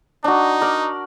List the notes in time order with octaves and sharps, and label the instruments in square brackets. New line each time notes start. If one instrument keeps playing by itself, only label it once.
[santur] D4 F#4 [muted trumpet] D#4
[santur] A#4 D5